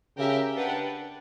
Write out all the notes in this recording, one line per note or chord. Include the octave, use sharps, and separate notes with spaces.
C#3 G4 A#4 E5 G5
D4 G4 B4 F#5